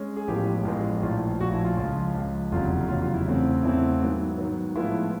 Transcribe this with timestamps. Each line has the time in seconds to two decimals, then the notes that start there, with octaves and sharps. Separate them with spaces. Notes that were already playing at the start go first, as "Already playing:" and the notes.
Already playing: G#3 C#4
0.16 G#4
0.27 A1 A2 F3 G#3 B3 G4
0.65 A1 A2 F3 G#3 B3
1.02 A#1 A2 F3 F4
1.40 A#1 A2 F3 F#4
1.52 E4
1.64 F4
1.77 C#2 C#3 F3 F4
2.14 C#2 C#3 F3
2.52 F1 E2 C#3 F#3 F4
2.89 F1 E2 C#3 F#3 F4
3.02 F4
3.14 E4
3.26 E2 C#3 E3 A3 C4
3.63 E2 C#3 E3 A3 C4 E4
4.02 G#2 D#3 F#3 B3
4.38 G#2 D#3 F#3 B3
4.75 A2 F3 G#3 B3 E4 F4